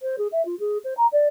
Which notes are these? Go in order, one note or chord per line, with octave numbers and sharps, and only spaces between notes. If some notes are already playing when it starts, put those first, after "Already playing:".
C5
G#4
E5
F4
G#4
C5
A#5
D5